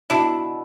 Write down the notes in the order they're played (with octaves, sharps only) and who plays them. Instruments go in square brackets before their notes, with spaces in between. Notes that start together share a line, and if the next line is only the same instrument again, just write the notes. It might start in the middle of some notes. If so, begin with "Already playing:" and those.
[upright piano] B2 [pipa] D4 E4